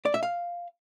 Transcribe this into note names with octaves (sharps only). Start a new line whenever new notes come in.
D5
E5
F5